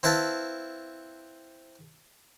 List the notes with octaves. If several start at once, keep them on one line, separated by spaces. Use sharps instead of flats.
C4 E4 B4 F5 A5